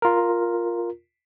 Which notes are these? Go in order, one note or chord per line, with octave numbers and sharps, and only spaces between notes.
F4 A#4